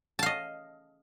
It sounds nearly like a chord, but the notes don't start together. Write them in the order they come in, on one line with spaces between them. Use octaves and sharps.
A5 F5 D#5